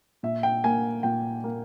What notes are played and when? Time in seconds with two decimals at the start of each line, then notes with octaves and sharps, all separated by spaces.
0.23 A#2 E5
0.43 G5
0.64 A#3 G#5
1.03 A#2 G5
1.44 A#3